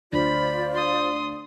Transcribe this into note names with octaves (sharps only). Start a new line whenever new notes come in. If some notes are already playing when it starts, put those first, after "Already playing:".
D2 F4 C5 D5 B5
C6 D#6